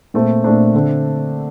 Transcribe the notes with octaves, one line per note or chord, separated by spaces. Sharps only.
A#2 A3 C4
A#2 A3 C4 D4
D3 A3 C4